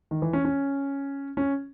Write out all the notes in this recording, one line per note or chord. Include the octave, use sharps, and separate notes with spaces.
D#3
E3
C#4
C#4
C#4